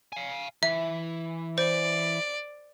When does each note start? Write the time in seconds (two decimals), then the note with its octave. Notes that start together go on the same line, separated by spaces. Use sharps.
0.13 F5 G#5
0.63 E3 E5
1.58 C5 D5